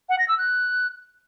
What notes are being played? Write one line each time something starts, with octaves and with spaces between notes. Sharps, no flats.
F#5
A#6
E6
F#6